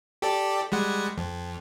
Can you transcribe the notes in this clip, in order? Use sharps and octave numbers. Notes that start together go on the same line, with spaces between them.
G4 A4 D5
G3 G#3 F#5
F2